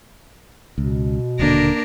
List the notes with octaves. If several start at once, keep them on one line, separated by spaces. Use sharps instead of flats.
C#2 B2
D#1 D3 A#3 D4 A#4